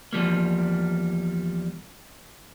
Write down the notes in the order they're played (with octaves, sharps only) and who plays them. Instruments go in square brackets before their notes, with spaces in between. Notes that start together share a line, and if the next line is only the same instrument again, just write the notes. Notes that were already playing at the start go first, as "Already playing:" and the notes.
[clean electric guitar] E2 F3 G3 A#3